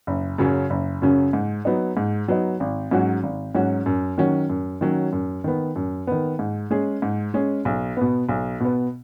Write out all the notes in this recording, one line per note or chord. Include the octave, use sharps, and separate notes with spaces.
F#1
F#2 C#3 F#3 C#4
F#1
F#2 C#3 F#3 C#4
G#2
F#3 B3 D#4
G#2
F#3 B3 D#4
G#1
G#2 F#3 C#4 F#4
G#1
G#2 F#3 C#4 F#4
F#2
D#3 F#3 C#4 F#4
F#2
D#3 F#3 C#4 F#4
F#2
D#3 B3
F#2
D#3 B3
G#2
G#3 C#4 G#4
G#2
G#3 C#4 G#4
B1
B2 B3
B1
B2 B3